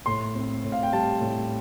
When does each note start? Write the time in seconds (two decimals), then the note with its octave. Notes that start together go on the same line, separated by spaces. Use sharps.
0.06 A2 C6
0.35 C4
0.64 A2
0.72 F5
0.83 G5
0.93 G3 A5
1.21 A2